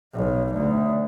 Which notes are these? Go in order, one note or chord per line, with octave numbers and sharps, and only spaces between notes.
B1
D2